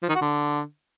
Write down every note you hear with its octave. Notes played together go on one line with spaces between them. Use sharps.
F3
D#3
F#4
D3